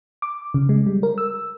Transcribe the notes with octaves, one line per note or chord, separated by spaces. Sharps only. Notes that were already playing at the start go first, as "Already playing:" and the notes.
D6
C#3
G#3
G3
A#4
E6